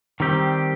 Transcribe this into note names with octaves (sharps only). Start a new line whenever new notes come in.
D#3 G3 C4 G4